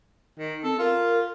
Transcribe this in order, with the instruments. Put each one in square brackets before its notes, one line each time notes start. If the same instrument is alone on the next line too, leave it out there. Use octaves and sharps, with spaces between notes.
[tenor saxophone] D#3
[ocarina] C4 [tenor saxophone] A4
[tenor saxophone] F4 [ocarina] A#4